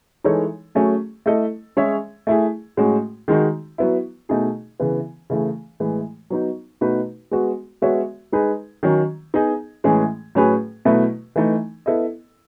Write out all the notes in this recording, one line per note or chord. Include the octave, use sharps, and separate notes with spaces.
E3 G#3 D#4 A4 C#5
F#3 A3 C#4 G#4
A3 E4 A4 D#5
G#3 C#4 G#4 C#5 E5
A3 E4 G#4
A2 G#3 C#4 F#4
D#3 G#3 D#4 F#4
F#3 B3 E4
B2 A3 D#4 G#4
C#3 E3 B3
C#3 E3 A3 E4 G#4
A2 E3 G#3
F#3 B3 D#4
B2 A3 D#4 F#4 B4
G#3 B3 F#4
G#3 B3 F#4 C#5 E5
G#3 D#4 G#4 B4
D#3 F#3 C#4
B3 D#4 G#4 D#5
A2 E3 G#3 C#4 G#4
A2 F#3 C#4 G#4 B4
B2 F#3 A3 E4 B4
E3 A3 D#4
B3 E4 A4 D#5